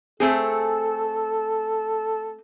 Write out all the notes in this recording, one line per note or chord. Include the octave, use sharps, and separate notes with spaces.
A3 C4 G#4 A4